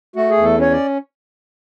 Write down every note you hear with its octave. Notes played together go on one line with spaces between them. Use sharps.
A3 F#4
G#4
E2
A4
C#4 C#5
D5